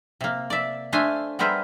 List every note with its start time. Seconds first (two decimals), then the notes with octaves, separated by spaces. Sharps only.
0.21 C3 A#3
0.50 D5 E5
0.93 A3 D4 C5 E5 F5 G#5
1.39 G3 B3 G#4 A#4 C5 E5